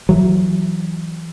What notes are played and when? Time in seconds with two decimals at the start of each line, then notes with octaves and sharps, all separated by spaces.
0.09 E3 F#3